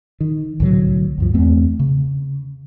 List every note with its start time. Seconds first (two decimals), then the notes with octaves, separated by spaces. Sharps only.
0.20 D#3
0.60 C2 A2 D3 F#3
1.18 D2 G2 F3
1.34 E2 A3 C4
1.79 C#3